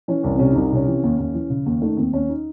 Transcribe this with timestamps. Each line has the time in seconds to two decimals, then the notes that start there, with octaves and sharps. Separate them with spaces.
0.08 E3 C#4
0.24 C2 C#4
0.36 C4
0.39 C3 C#4
0.52 D#4
0.56 C2
0.64 D#4
0.72 C3 C#4
0.87 E3
1.03 D#2
1.19 D#2
1.34 E3
1.50 C#3
1.66 D#2
1.82 D#3 A3
1.97 D#2 C4
2.13 D#2 C#4
2.29 D#4